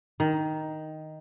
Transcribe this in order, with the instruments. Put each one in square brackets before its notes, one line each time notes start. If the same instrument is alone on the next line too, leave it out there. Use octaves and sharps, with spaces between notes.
[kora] D#3